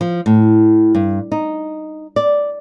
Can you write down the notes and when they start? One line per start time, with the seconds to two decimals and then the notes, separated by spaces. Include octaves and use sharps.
0.01 F3
0.26 A2
0.95 G2
1.32 D#4
2.16 D5